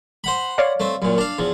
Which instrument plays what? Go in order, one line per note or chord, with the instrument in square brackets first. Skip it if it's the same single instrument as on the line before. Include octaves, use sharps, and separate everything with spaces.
[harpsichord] C5 F#5 B5
[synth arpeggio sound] C#5 D5 F5
[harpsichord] A3 C4
F#2 A#2
D4 F5
E2 F3